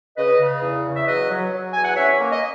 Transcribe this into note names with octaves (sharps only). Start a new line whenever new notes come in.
C#3 B4 D#5
C#3
E2
C#3
E5
F#3 B4 D#5
F#3
F#3
E2 G#5
F#5
C#4 C#5 E5
A#3
D#5